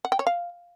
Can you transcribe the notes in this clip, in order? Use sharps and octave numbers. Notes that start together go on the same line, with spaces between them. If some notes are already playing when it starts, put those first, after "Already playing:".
F#5
G5
C#5
F5